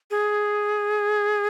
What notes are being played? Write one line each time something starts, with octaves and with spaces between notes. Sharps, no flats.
G#4